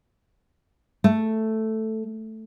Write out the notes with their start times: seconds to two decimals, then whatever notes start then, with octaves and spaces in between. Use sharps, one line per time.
1.04 A3